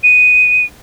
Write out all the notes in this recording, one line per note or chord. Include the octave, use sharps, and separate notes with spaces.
D#7